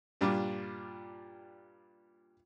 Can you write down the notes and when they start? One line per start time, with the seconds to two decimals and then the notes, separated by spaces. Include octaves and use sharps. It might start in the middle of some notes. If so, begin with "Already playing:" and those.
0.21 G2 A#2 G3 D4 F4